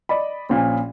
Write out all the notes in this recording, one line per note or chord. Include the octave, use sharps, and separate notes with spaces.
D5 D#5 B5
A#1 A#2 C#4